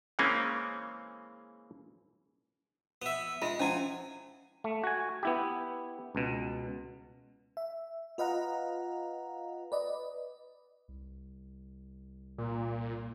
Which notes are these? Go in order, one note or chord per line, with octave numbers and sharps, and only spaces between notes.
C#3 E3 G#3 A#3 C4 C#4
B3 E5
G#3 F4 E5
F3 C#4 E4 F#5 G#5
A3
F#4 G#5
B3 E4 G4
C#2 B2
E5
F4 B4 D#5 F5 F#5 A#5
B4 D5 D#5
C2
A#2